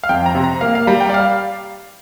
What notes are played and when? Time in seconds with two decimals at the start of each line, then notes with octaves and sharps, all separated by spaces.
0.03 F5
0.09 F2 G5
0.26 A#5
0.35 C3
0.44 A#5
0.61 A#3 F5
0.75 F5
0.87 G3 A#5
1.00 G5
1.09 D5
1.14 F5